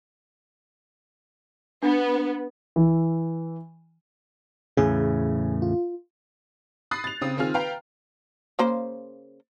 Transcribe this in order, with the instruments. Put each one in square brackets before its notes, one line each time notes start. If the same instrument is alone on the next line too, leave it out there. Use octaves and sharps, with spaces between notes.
[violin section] B3 [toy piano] D4
[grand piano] E3
[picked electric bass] E2 A2 C#3 [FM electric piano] G#4
[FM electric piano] F4
[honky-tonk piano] B5 D#6 F#6 A6 C7
A6 F7
C#3 C4 D#6
D#3 C4 F4 G#4 F6
B4 F5 G5 A#5
[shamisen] C#3 A#3 C5